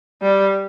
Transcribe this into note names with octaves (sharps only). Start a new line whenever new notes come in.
G3